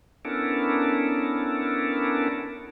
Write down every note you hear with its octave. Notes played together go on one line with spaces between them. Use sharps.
B3 C#4 D4 E4 A4 A#4